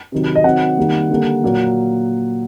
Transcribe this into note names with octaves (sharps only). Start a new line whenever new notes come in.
C3 D#3 F#3
D#5
D#3 F#3 C4 F#5
D#3 G3 A#3
D3 G3 A#3
A#2 F#3 A#3